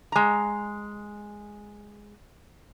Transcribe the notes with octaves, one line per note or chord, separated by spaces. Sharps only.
G#3 A#5